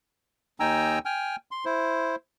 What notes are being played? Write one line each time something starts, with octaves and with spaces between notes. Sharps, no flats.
D#2 D#4 G5 G#5 A#5 E6
G5 G#5 F6
C6
E4 C5